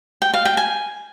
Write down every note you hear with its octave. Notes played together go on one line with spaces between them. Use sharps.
G5
F5
G5
G#5